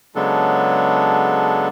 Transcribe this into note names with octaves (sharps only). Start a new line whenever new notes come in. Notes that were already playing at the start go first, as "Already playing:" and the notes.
C#3 F#3 G#3 B3 D4 A4